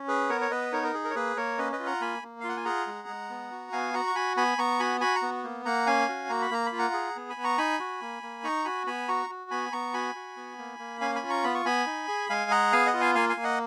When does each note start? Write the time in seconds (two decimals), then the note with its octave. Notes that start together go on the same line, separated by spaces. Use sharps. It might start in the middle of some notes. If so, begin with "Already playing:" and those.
Already playing: C#4
0.08 G#4 B4
0.29 B3 A#4 C#5
0.41 C#5
0.51 B3 B4 D#5
0.72 D#4 A#4 C#5
0.83 A#4
0.94 G#4
1.05 A#4
1.10 C#5
1.15 A#3 G#4 B4
1.37 A#3 A#4 C#5
1.58 C#4 B4 D#5
1.72 B4 D#5
1.80 F4
1.86 F#5 A#5
2.01 A#3 G#5 B5
2.23 A#3
2.40 F5
2.44 F4 F#5
2.57 G#5
2.65 G#4 F#5 A#5
2.87 G#3
3.08 G#3
3.30 B3
3.51 F#4
3.72 B3 F5 G#5
3.94 F#4 F#5 A#5
4.07 C#6
4.15 F#4 G#5 B5
4.37 B3 G#5 B5
4.58 B3 A#5 C#6
4.80 F#4 G#5 B5
5.00 F#4 G#5 B5
5.15 F#5 A#5
5.22 B3
5.44 A#3
5.65 A#3 F#5 A#5
5.87 C#4 F5 G#5
6.09 F#4
6.29 A#3 A#5
6.42 B5
6.51 A#3 A#5
6.66 B5
6.72 F4
6.78 F#5 A#5
6.94 G#4
7.16 B3
7.29 G#5 B5
7.37 B3
7.44 A#5 C#6
7.58 D#4 G#5 B5
7.80 F#4
8.01 A#3
8.23 A#3
8.44 D#4 A#5 C#6
8.65 F#4 G#5 B5
8.86 B3 G#5 B5
9.08 F#4 A#5 C#6
9.30 F#4
9.51 B3 G#5 B5
9.72 B3 A#5 C#6
9.94 F#4 G#5 B5
10.15 F#4
10.36 B3
10.58 A#3
10.79 A#3
11.01 C#4 F5 G#5
11.15 G#5 B5
11.23 F4
11.29 A#5 C#6
11.44 B3 B5
11.54 C#6
11.65 B3 G#5 B5
11.86 D#4
12.08 G#4
12.30 G#3 F5 G#5
12.51 G#4 F#5 A#5
12.72 B3 F5 G#5
12.86 D#5 F#5
12.94 F4
13.01 F5 G#5
13.15 A#3 F5 G#5
13.29 F5 G#5
13.37 A#3
13.44 D#5 F#5